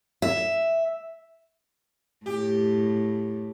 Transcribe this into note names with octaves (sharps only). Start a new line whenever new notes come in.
E5
A2 G4